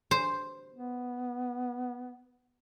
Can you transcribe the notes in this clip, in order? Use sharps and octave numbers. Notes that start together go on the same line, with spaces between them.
C5
B3